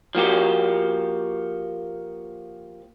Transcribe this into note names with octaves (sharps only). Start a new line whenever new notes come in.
F3 A#3 F#4 G4